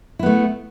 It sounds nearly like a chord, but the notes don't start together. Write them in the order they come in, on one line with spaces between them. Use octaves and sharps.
E4 B3 A3